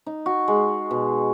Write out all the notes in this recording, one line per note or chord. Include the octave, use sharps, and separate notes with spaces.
D#4
F#4
G#3
B2